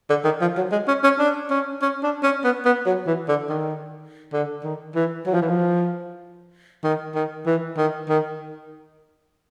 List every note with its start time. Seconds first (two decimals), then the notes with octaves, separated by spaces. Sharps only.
0.10 D3
0.24 D#3
0.41 F3
0.57 F#3
0.72 G#3
0.88 C#4
1.04 C#4
1.19 D4
1.50 C#4
1.82 C#4
2.03 D4
2.23 C#4
2.44 B3
2.65 B3
2.86 F#3
3.07 E3
3.28 D3
3.49 D#3
4.33 D3
4.64 D#3
4.95 E3
5.26 F#3
5.34 F3
5.42 E3
5.49 F3
6.84 D#3
7.15 D#3
7.46 E3
7.77 D#3
8.09 D#3